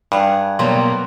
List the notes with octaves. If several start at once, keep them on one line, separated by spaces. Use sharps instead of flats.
G2 G#4 F#5
B2 F#3 G3 A#3 C6